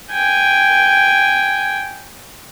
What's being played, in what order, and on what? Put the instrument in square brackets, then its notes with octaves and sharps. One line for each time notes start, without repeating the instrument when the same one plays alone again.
[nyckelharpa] G5 G#5